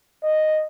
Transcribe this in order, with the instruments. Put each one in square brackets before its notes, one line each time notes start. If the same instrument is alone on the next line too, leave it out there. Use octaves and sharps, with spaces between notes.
[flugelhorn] D#5